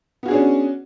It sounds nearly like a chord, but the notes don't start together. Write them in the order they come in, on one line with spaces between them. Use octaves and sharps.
B3 F#4 G#4 D4 C#4